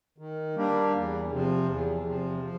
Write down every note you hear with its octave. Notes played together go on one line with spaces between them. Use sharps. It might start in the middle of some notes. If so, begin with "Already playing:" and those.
D#3
G3 A#3 D4
E2
C3 F3
E2
C3 F3
F3